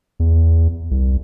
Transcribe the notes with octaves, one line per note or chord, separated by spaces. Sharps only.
E2
C2